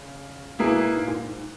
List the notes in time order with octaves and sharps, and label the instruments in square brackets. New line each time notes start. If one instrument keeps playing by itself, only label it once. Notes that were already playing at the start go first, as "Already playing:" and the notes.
Already playing: [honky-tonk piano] C#3
[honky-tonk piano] B2 [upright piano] A#3 E4 G#4 B4
[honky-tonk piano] A#2
G#2
A#2
G#2